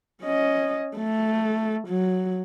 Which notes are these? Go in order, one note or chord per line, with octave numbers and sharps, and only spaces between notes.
C#4 D#5
A3
F#3